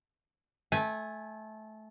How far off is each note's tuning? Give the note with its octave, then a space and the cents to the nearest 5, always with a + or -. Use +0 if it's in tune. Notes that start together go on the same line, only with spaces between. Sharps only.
A3 -20 G#5 +0